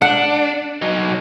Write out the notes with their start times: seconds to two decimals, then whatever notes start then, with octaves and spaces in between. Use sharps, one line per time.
0.02 D4 F#5
0.82 F#3 D#4